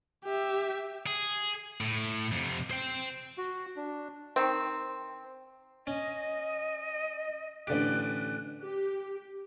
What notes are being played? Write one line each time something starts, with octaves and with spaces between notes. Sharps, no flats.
G4 E5
G#4
A2
F2 C3
C5 G5
F#4
D4
D#3 C4
C#4 D#5
A1 D3 G4 F#6
G4